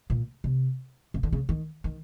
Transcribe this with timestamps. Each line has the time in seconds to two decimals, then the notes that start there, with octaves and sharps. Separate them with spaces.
0.10 A#2
0.44 C3
1.14 C#3
1.23 D3
1.32 C#3
1.49 D#3
1.84 D#3